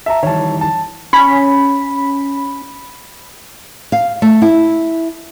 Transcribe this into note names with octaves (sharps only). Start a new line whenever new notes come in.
E5 A5 A#5
D#3 E3 G3 C#5 A5
A5
C#4 B5
F5
A3
E4